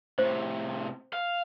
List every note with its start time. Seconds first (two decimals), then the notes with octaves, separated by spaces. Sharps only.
0.19 A2 C3 C5
1.13 F5